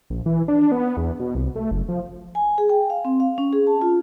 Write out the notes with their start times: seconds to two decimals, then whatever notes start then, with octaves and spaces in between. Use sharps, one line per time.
0.10 A#1
0.26 E3
0.48 D4
0.72 B3
0.97 E2
1.20 B2
1.35 C2
1.56 A3
1.71 F#1
1.88 F3
2.35 G#5
2.58 G#4
2.69 G5
2.90 F5
3.05 C4
3.20 F5
3.38 C#4
3.53 G#4
3.67 A5
3.82 F4